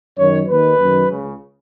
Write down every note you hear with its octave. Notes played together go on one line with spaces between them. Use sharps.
F#2 D#3 C#5
D#2 D#3 B4
F#2 D#3
C#2 C#3